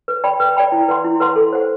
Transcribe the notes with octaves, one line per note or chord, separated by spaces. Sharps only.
B4
D5 G5 B5
B4
D5 G5 B5
E4
B4 F#5 C6
E4
B4 F#5 C6
A4
C5 F#5